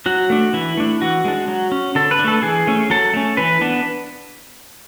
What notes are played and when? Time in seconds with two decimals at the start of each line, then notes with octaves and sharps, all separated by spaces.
0.06 F#3 F#4
0.30 A3 D4
0.53 E3 E4
0.77 A3 D4
1.02 E3 F#4
1.25 G#3 D4
1.48 F#3
1.72 C#4
1.95 D3 A4
2.11 B4
2.19 D4
2.24 A3 A4
2.43 E3 G#4
2.67 A3 C#4
2.90 F#3 A4
3.14 A3 C#4
3.37 E3 B4
3.61 B3 D4